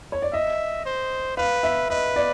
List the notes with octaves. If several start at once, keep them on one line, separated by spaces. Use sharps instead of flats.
C#5
D5
D#5 E5
C5
B4 F5
E5
B4 D#5
D5